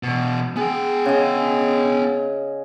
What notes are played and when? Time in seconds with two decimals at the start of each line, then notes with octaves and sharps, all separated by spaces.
0.03 E2 B2
0.57 B3 G#4 G5
1.06 C#3 D#5